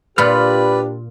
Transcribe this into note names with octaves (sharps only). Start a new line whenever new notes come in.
A#2 D4 F4 G4 B4 D5 B5 F6